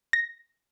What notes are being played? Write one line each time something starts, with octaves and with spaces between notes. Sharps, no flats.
A#6